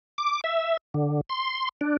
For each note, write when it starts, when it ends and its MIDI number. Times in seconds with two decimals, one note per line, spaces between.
0.18 0.41 86
0.44 0.77 76
0.94 1.21 50
1.29 1.69 84
1.81 1.97 62